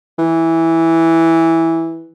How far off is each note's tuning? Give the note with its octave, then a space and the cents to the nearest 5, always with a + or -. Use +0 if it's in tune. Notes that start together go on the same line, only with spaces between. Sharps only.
E3 -5